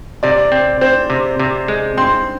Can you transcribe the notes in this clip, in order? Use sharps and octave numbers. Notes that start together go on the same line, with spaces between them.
C3 D5
C4
C4 C5
C3
C3
G#3
C4 C6